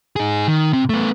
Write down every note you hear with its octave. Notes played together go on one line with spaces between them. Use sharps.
D#4 G#4
D#3
C3
A3 B3